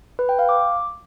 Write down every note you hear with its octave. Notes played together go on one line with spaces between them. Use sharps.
B4
G5
F5
D6